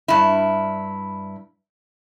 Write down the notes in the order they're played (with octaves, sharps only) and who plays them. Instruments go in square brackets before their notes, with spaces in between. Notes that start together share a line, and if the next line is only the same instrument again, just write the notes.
[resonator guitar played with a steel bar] G2 E4